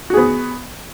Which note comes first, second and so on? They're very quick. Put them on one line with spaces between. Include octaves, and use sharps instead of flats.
F#4 G#4 B3